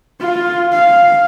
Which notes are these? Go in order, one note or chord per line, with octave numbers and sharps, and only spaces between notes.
F4
F5